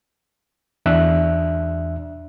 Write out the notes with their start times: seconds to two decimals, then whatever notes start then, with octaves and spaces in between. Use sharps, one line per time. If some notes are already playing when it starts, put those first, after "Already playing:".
0.86 E2 D4 E5 F#6